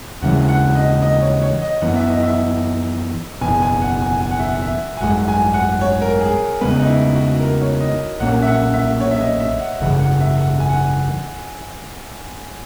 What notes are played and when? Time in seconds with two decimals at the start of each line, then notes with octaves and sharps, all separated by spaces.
0.22 D#2 C#3 E3 G#3 F#5
0.49 F#5
0.75 D#5
1.02 D#5
1.21 C#5
1.42 C#5
1.62 D#5
1.81 F#2 E3 B3 F#5
1.96 E5
2.09 D#5
2.22 E5
3.41 F#1 E2 B2 G#5
3.62 G#5
3.82 F#5
4.01 G#5
4.21 G#5
4.31 F#5
4.39 E5
4.49 F#5
4.62 E5
4.97 G#5
5.01 G#1 F#2 D#3 G#3 F#5
5.28 G#5
5.54 F#5
5.81 C#5
6.02 A#4
6.21 G#4
6.61 E2 C#3 G#3 B3 B4
6.80 D#4
6.87 E4
7.14 F#4
7.40 A#4
7.61 C#5
7.80 D#5
8.20 B1 A#2 A#3 C#4 F#5
8.42 E5
8.47 F#5
8.74 E5
9.00 C#5
9.11 E5
9.20 D#5
9.40 E5
9.60 F#5
9.80 G#1 F#2 C#3 E3 F#5
10.00 F#5
10.20 E5
10.40 F#5
10.60 G#5
10.69 F#5